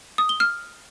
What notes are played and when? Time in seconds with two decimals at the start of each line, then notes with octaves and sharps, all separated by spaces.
0.18 D#6
0.29 G7
0.40 F6